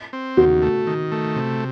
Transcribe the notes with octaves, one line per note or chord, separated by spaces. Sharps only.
C4
D#2 F#4
A3
D#3
A3
C3